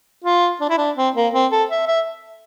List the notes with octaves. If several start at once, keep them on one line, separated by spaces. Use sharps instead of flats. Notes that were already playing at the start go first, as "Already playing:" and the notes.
F4
D4
E4
D4
C4
A#3
C4
A4
E5
E5